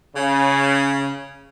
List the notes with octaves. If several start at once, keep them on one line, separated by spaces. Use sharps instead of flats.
C#3